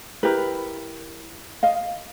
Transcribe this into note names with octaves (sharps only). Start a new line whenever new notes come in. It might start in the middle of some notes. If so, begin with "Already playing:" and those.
E4 G4 A#4 B4
D#5 F5